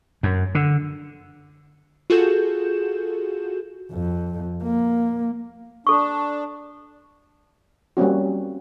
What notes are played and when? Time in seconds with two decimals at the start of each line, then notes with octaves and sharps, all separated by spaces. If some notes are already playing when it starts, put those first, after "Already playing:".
0.23 F#2
0.55 D3
2.10 F4 F#4 G#4 A4 G6 E7
3.92 F2
4.63 A#3
5.87 D4 A4 C#6
7.97 G3 A#3 C4 C#4 F#4